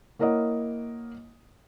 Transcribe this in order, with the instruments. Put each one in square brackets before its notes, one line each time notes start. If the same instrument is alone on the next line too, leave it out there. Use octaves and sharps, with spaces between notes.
[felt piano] A#3 E4 A#4 C#5 D#5 F#5